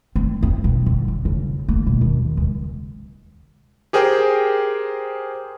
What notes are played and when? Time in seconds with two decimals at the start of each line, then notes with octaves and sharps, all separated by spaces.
0.16 C4
0.43 C4
0.64 B1
0.86 D3
1.08 F#2
1.25 C#3
1.68 A#3
1.87 B2
2.01 D#2
2.37 C#2
3.93 G4 G#4 A#4 C5 G5